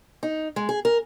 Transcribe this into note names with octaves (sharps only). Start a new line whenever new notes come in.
D#4
G#3
G#4
A#4